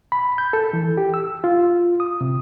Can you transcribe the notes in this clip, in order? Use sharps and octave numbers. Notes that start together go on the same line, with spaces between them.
B5
G6
A4
E3
G4
E6
F4
D#6
C3